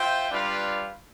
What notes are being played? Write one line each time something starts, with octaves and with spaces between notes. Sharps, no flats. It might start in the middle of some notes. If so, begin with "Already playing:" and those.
Already playing: F4 C5 E5 G5
G3 D4 F4 B4 F5